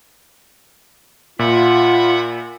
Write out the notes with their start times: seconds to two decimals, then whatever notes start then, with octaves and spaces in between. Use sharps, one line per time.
1.39 A#2 F4 E5 F#5 B5